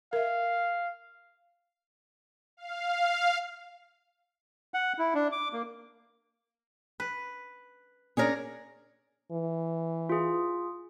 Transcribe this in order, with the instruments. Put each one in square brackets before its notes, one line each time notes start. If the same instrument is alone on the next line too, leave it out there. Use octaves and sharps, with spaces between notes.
[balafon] A#4 E5 [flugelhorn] F5
[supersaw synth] F5
[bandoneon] F#5
E4
D4
D6
A#3
[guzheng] B4
[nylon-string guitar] C#4 D4 C#5 [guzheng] G#4 A#4 D5
[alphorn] E3
[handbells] F4 G#4